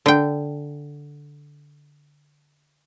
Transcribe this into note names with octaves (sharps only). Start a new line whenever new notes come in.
D3 G5